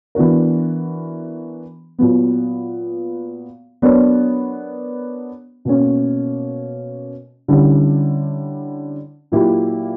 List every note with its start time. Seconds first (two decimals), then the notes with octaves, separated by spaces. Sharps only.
0.15 E3 B3 D4 F#4 A#4
1.99 A#2 F#3 B3
3.82 F#3 B3 D4 A#4 C#5
5.65 B2 A#3 C#4
7.48 D3 G3 C#4 E4
9.32 A#2 F#3 A#3 E4 G4